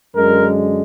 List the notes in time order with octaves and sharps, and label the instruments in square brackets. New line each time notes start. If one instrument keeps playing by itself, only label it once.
[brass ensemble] F#2 D3 G#3 A#4